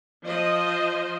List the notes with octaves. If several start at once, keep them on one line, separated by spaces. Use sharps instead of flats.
F3 C5 D#5